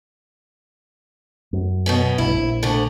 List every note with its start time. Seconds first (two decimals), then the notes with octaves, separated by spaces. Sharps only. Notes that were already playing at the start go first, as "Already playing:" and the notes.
1.53 F#2
1.86 B2 B3 C#4
2.18 B1 G2 E4
2.35 A#1
2.63 D2 D3